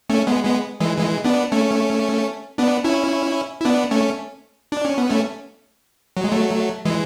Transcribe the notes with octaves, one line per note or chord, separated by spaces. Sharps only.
A3 C#4
G#3 B3
G#3 B3
E3 G#3
E3 G#3
B3 D4
A3 C#4
B3 D4
C#4 E4
E4
B3 D4
A3 C#4
D4
C#4
B3
A3 C#4
F#3
G#3
F#3 A3
E3 G#3